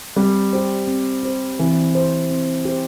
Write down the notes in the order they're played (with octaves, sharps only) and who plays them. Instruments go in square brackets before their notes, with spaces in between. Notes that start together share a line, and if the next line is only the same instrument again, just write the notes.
[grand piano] G3 [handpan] C4
[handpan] G4 C5
C4
G4 C5
[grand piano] E3 [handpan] C4
[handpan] G4 C5
C4
G4 C5